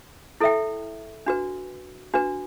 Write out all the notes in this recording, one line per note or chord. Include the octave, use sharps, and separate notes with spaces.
E4 A4 E5 G5
D4 F#4 B4
D4 F#4 B4